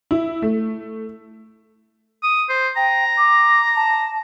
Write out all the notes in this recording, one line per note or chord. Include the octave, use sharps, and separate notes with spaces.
E4
A3
D#6
C5
G5 A#5
D6
A5